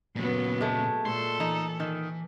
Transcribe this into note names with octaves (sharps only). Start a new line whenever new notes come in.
A#2 C#3 F#3 A#3 B3
G#3 A3
A#2 A4 C6
E3 D#4
D#3